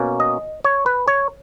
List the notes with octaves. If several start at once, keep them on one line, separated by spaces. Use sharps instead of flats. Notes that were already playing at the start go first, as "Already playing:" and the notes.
Already playing: B2 A#3 C#4
D#5
C#5
B4
C#5